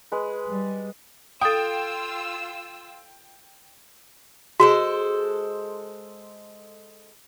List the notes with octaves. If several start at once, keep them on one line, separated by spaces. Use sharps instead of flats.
G#3 B4
G3
F4 A4 G5 D#6 E6
G#3 F#4 A4 C5